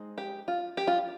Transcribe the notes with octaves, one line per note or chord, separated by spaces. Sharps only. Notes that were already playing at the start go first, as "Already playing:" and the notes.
Already playing: G#3 C4 D#4
G4
F4
G4
F4